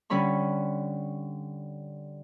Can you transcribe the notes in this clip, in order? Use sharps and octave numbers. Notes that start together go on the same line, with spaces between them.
D3 G3 C#4 B5 C#6